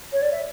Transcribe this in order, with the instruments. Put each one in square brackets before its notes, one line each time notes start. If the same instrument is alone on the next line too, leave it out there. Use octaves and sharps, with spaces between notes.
[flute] C#5
D5
E5